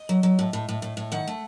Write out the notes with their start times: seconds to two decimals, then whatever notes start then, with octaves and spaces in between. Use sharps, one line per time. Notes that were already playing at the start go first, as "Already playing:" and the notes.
Already playing: D#5
0.09 F#3
0.23 F#3
0.39 A2
0.53 A2
0.69 A2
0.82 A2
0.97 A2
1.12 D#3 F#5
1.27 A3